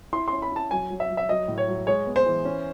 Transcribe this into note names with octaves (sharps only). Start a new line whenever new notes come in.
E4 C6
C6
C#4
B5
E4 A5
F#3 G#5
F#3
E5
F#3
E5
F#3 D#5
A2
C#5
F#3
G#3 C#5
B3
C5
E3
C#4